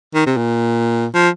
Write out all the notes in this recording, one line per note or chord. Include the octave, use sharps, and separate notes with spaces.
D#3
C3
A#2
F3